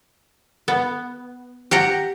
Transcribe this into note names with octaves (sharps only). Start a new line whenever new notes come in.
B3
G4 F#5 A#5